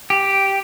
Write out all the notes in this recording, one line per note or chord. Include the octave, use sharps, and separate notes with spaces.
G4